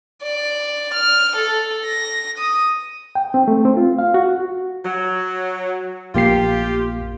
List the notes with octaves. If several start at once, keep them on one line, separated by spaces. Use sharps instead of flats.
D5
F6
A4
A#6
D#6
G5
C4
A3
C4
F4
F5
F#4
F#3
A#1 A#3 F4 G4 C7